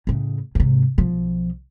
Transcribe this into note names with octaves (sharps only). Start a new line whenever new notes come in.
A2 C#3
G#2 C3
B1 F3